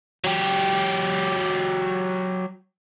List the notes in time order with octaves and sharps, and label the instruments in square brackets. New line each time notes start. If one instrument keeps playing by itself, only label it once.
[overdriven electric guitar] F#3 G4